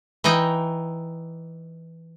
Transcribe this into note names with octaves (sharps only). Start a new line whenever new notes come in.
E3 D#4 D#5 G5 A#5